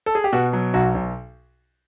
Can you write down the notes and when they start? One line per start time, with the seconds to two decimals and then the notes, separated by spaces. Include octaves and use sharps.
0.06 A4
0.15 G#4
0.24 G4
0.33 B2 F#4
0.53 F#3
0.74 B1 F#4
0.94 B1